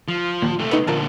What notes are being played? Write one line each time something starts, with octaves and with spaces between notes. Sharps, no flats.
F3
D#2 A#2
C3 A3
B3 D#4
A#2 D3 F3 A#4 A5